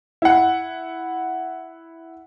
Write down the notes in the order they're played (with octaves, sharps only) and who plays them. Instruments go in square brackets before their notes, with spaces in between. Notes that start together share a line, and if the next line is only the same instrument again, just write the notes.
[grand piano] E4 F#5